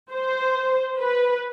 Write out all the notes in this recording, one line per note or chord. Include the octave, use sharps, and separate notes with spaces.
C5
B4